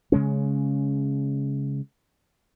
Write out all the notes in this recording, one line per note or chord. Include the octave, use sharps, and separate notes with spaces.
C#3 G#3 C#4